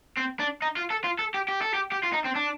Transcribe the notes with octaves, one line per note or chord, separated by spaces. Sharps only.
C4
D4
D#4
F4
A4
F4
A4
G4
G4
A4
G4
G4
F4
D#4
C4
D4